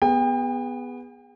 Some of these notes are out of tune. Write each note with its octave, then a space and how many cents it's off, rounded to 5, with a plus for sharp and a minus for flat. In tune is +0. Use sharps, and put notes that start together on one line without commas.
B3 +0 G#4 -25 G5 +35